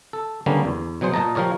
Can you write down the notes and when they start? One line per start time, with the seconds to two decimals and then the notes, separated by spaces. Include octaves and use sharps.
0.13 A4
0.46 D3 G3 A#3 B3 C#4
0.65 E2
1.01 B2 F#3 G#4 C5
1.14 A#2 D#5 A5 A#5
1.35 F3 G4 A#4 C#5 D5